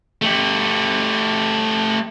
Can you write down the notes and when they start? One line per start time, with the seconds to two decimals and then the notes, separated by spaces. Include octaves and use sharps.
0.22 A3 G4